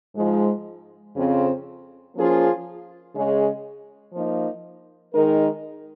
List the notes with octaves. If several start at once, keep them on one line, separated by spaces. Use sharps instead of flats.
G#2 F3 G#3
F2 C#3 F3 C4
F3 A#3 C#4 F4 G#4
C#3 G#3 C#4 G#4
F3 A#3 D#4
D#3 G#3 D#4 A#4